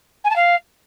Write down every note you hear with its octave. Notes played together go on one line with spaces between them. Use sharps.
G#5
A5
F5